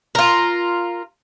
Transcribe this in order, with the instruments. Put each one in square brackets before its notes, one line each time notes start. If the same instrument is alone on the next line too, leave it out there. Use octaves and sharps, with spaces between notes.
[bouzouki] F4 A#4